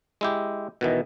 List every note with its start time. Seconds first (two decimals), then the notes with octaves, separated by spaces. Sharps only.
0.21 G#3 E4 G4
0.81 B2 D#3 E3